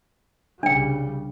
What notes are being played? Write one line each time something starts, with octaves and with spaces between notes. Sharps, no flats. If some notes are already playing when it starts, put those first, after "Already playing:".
C2 C#3 G3 D4 G5